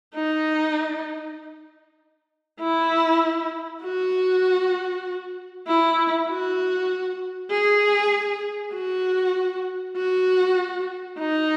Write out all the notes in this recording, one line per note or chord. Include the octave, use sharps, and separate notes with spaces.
D#4
E4
F#4
E4
F#4
G#4
F#4
F#4
D#4